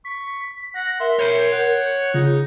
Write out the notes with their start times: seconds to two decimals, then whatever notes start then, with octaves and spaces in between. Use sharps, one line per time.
0.05 C#6 B6
0.75 F#5 A#6
1.00 A#4 E5 C6
1.19 C#5 B5 G6
1.52 F#5
2.14 C#3 D#4 F4